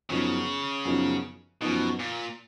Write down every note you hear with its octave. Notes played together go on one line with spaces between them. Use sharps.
F#2 C#3 F3 B3 D#4
F#2 F3 B3 D#4
F#2 B2 F3 B3 D#4
A#2